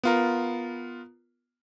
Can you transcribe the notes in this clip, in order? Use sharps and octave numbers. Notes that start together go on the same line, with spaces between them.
B3 F4 A#4